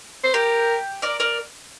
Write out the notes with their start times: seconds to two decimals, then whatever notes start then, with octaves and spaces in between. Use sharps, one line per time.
0.24 C5
0.34 G4 A#4
1.02 A#4 D5
1.20 A#4 D5